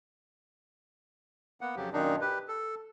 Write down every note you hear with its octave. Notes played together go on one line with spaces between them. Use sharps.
A#3 B3 F#5
F2 C#3 F#3 G4
F#2 A#2 D#3 D4 D#4
G4 B4
A4